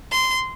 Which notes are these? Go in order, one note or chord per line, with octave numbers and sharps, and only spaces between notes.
C6